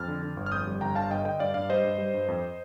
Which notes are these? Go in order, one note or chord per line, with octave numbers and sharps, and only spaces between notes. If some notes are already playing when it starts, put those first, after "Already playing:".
Already playing: F2 F6 A6
D3
D3
G1
F6
F2 D#6 G6
G3
G1 G5 A#5
D3 F5 A5
G2 D#5 G5
D3 D#5 G5
G2 D5 F5
G2 D5 F5
G3 C5 D#5
G2
G3
G2
F2